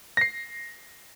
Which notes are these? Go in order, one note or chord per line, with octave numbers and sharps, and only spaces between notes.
A#6 C7